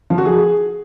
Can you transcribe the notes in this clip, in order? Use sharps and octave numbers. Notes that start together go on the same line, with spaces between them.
F3
F#4
G#4